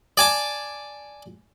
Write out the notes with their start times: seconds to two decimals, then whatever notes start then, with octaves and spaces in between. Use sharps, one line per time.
0.17 D5 G#5 A5